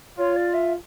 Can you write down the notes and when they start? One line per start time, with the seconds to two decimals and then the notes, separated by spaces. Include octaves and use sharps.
0.18 F4 C#5
0.36 D5
0.54 E5